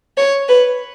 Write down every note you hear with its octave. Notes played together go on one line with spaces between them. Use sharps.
C#5
B4